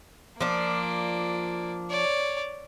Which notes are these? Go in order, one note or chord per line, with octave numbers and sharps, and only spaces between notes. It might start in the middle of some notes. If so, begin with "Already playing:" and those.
F3 A#3 D4 D5
C#5 D5